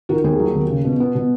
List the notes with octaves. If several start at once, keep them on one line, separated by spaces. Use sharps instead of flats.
D#3 F#4 A#4
D#2 G#4
F#3
D#2
C#3
B2
B3
B2